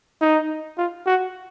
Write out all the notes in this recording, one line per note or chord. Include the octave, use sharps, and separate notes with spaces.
D#4
F4
F#4